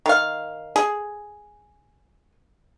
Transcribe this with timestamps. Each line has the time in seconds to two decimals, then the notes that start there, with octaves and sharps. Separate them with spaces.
0.06 D#3 F5
0.76 G#4